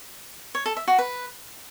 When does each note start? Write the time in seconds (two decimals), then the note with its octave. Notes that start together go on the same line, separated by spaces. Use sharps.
0.55 C#5
0.66 A4
0.77 E5
0.88 F#4
0.99 B4